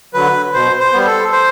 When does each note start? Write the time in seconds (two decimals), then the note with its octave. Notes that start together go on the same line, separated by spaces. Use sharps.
0.14 D3 F#3 B4
0.54 B2 C5
0.80 C5
0.93 G3 B3
1.06 A4
1.32 C5